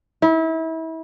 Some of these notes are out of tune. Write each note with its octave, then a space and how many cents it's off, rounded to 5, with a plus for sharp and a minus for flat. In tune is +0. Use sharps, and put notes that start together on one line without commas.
E4 -30